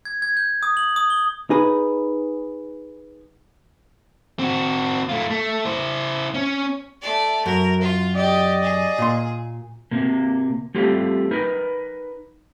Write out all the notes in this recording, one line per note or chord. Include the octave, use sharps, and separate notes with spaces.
G#6
G#6
G6
D#6
F#7
D#6
G7
D#4 G#4 B4
C4 F#4
A3 F4
A3
E4 C5
C#4
A3 D5
F#2 A#4
F4
G4 D5 D#5
G#4
A#2 C6
C3 A#3
G3 A3 C4 F4 G4
D#4 A#4 B4